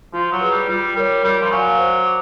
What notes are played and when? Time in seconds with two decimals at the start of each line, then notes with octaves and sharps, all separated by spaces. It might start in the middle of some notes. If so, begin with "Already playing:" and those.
0.13 F3 F4
0.32 F#3
0.41 G#4 B4
0.51 G3
0.68 G3 F4
0.95 G3 A#4 C#5
1.24 G3 A#4
1.42 F3
1.51 F#3 D5 F5 G#5 C#6
1.78 C5
2.06 D6